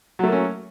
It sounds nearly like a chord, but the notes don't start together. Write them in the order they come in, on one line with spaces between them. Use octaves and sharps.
F#3 A3 A#3 C#4